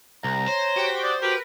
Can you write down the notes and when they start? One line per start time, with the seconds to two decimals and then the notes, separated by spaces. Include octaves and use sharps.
0.24 C2 A#5
0.47 C5 C#5
0.76 F#4 G4 G5
1.03 D5 D#6
1.22 F#4 G4 A#4 B4